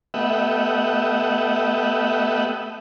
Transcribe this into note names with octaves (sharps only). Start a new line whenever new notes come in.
A3 B3 G4 D#5 E5 F#5